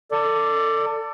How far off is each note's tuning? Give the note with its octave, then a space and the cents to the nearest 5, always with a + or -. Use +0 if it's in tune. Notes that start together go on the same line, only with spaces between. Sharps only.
A4 +30 D5 +0